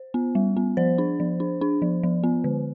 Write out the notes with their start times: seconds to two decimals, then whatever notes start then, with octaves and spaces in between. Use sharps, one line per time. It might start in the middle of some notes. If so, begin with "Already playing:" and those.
Already playing: C5
0.14 B3
0.35 G3
0.57 B3
0.77 F3 C5
0.98 D4
1.20 F3
1.40 D4
1.61 D4
1.82 F3
2.03 F3
2.24 B3
2.44 D3